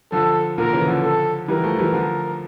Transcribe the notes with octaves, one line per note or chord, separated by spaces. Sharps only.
D3 F3 A4
A#2 D3 A#4
C#3 E3
D3 F3
A4
E3 G3 A#4
F3 A3
E3 G3
D3 F3